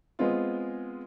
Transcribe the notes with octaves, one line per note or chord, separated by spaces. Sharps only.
G#3 B3 C4 F4